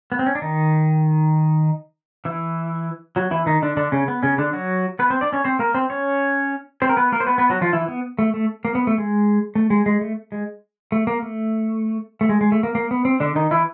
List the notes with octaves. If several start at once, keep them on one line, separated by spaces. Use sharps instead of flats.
B3
C4
C#4
D4
D#3 D#4
E3 E4
F#3 F#4
E3 E4
D#3 D#4
D3 D4
D3 D4
C#3 C#4
B3
C#3 C#4
D3 D4
F#3 F#4
B3 B4
C4 C5
D4 D5
C#4 C#5
C4 C5
A#3 A#4
C4 C5
C#4 C#5
C4 C5
A#4
B3 B4
A#3 A#4
C5
B3 B4
B3 B4
F#3 F#4
F3 F4
E3 E4
B3
A3
A3
A#3
B3
A3
G#3
A3
G#3
G#3
A3
G#3
A3
A#3
A3
A3
G#3
G#3
A3
A#3
A#3
B3
C4
D3 D4
D#3 D#4
E3 E4